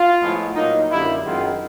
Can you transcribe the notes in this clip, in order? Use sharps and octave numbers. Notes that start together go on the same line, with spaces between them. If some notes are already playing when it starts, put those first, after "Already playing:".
Already playing: F4
A2 F3 G#3 B3
A#2 F#3 A#3 D#4
F#2 D3 G3 A#3 E4
F#2 D#3 G#3 B3 F4